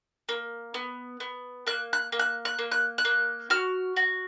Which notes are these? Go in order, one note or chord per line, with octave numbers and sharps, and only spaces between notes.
A#3
B3
B3
A#3 F#6
F#6
A#3
F#6
F#6
A#3
F#6
F#6
A#3
F#4 F6
F#4